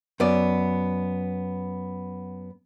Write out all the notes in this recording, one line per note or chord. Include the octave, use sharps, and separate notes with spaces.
F#2 B3 D5